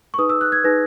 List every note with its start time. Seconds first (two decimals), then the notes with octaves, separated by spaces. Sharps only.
0.14 C#6
0.18 D#4 G#4 B4 D#6
0.29 E6
0.41 F#6
0.52 G#6
0.64 D#4 G#4 B4 A#6